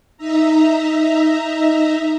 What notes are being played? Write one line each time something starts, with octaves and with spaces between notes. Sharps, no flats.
D#4 E5 A#5